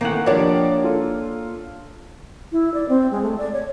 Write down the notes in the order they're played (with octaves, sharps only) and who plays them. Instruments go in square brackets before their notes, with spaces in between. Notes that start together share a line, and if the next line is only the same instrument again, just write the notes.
[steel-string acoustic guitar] C3 E3 A3 [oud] D#3 [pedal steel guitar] A#3 F#5
[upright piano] F3 A#4 D5 [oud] D4 G4 [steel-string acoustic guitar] C#5 A#5
[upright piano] F4 A4
[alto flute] E4
D5
C4
G#3
A3
D5
C#5